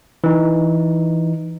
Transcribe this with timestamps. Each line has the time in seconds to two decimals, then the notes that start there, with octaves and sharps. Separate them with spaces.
0.24 E3 D#4